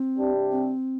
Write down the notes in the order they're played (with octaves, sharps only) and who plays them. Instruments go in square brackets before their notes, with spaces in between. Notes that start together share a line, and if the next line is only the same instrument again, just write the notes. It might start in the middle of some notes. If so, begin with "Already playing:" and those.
Already playing: [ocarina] C4
[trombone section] C3 G3 D4 G4
[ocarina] C4